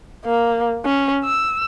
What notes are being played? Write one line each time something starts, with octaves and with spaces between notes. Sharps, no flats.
A#3
C#4
E6